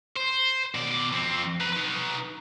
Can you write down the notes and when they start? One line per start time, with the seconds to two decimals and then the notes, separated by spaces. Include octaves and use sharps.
0.16 C5
0.75 B2 D5
1.12 F2 C4
1.60 B4 A#5
1.73 D#4 B4